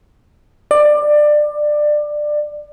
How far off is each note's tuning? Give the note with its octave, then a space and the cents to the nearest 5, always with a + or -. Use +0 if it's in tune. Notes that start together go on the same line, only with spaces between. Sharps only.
D5 +20